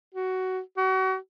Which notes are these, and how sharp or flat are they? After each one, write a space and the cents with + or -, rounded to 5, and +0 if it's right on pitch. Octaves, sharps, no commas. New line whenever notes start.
F#4 +15
F#4 +35